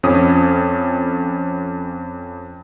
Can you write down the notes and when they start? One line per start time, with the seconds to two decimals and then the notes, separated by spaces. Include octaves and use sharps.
0.03 F2 C#4 D#6